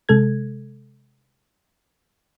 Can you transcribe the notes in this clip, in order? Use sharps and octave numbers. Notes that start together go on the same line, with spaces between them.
C3 G#3 A4 G#6